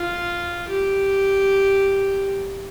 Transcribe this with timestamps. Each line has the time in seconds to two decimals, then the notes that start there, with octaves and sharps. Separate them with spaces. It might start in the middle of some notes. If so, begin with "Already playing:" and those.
Already playing: F4
0.68 G4